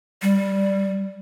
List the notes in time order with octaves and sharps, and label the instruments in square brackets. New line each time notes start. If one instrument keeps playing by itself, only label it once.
[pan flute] G3